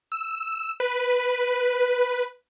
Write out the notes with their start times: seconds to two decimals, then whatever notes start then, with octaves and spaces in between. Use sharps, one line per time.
0.12 E6
0.80 B4